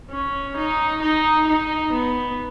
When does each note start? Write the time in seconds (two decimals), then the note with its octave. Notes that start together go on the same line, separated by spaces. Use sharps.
0.11 C#4
0.57 D#4
1.02 D#4
1.47 D#4
1.93 B3